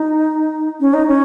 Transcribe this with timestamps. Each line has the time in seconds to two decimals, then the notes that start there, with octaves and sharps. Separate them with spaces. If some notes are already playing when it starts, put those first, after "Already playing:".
Already playing: D#4
0.80 C#4
0.94 D#4
1.07 C#4